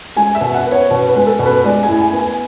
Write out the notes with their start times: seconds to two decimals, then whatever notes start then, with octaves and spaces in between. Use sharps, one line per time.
0.17 G#3 G#5
0.35 E5
0.41 B2
0.54 F#5
0.66 B3
0.72 C#5
0.90 B2 B4
1.09 B4
1.15 G#3
1.27 A4
1.39 B2
1.46 B4
1.64 G#3 D5
1.83 G#5
1.88 A2
2.01 G#5
2.13 B3
2.19 G#5